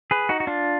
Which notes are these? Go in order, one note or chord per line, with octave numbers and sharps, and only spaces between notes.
G#4 B4
D#4 F#4
F#4
D4 F4